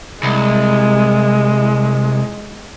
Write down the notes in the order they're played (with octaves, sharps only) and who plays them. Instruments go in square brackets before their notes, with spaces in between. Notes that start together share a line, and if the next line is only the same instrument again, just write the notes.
[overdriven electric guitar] C2 [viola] G#3